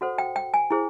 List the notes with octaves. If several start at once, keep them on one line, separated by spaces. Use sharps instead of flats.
F#4 A4 C5 F#5
G5
G5
G#5
E4 G#4 C5